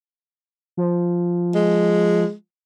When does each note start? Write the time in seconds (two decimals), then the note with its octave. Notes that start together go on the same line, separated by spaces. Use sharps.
0.77 F3
1.54 G#3